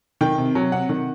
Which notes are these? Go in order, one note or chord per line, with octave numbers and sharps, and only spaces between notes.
D#3 G5
C3
F#3
C3 F#5
D#3